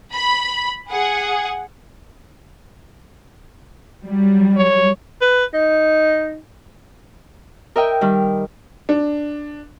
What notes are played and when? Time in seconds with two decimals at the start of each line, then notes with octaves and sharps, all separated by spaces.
0.13 B5
0.91 G#4 F#5
4.05 F#3 G3
4.57 C#5
5.21 B4
5.54 D#4
7.76 A#4 D#5 E5 G5
8.01 D#3 G3
8.89 D4